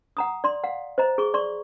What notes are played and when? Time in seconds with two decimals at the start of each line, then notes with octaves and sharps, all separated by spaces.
0.17 F#5 A#5 D#6
0.44 D5 C6
0.64 F5 F#5
0.98 C5 D#5 A#5
1.18 G#4 C#6
1.34 D5 C6 C#6